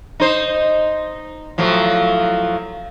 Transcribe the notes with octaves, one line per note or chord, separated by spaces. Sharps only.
D#4 C5
A2 F3 F#3